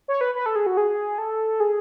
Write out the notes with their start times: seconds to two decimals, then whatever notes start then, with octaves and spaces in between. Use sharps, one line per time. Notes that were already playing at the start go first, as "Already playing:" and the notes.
0.08 C#5
0.21 B4
0.35 B4
0.46 A4
0.56 G#4
0.66 F#4
0.77 G#4
1.18 A4
1.60 G#4